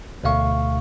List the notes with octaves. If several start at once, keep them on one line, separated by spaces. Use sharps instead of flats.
D2 B2 A3 F5 C#6